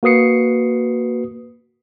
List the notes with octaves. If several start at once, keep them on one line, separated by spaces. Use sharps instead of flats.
A#3 F#4 B4 D#6 C7 C#7